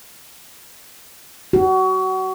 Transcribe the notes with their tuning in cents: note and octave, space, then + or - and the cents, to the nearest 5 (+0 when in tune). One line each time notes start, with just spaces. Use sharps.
F#4 +25